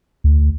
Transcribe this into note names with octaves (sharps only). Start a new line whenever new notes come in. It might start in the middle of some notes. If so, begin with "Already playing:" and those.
D2